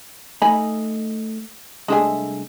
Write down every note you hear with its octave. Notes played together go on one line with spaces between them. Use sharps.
A3 D#4 D#5 G#5 B5
C2 G#3 A3 D4 G#4 E5